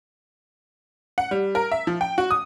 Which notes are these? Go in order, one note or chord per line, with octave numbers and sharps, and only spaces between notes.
F#5
G3
A#4
E5
F3
G5
F#4
D#6